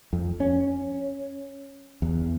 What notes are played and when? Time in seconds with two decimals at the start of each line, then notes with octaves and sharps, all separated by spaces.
0.13 F2
0.40 C#4
2.02 E2